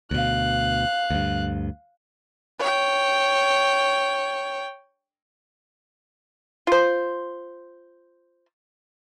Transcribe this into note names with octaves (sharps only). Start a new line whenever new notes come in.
D2 B2 F5 F#6
D2 G2
C#5 G5
F4 C5